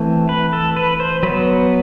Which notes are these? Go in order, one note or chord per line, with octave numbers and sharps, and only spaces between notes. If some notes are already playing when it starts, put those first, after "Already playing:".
Already playing: E3 A3 C4
B4
A4
B4
C5
F#3 B3 B4